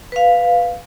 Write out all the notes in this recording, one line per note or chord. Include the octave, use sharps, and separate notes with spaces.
B4 F5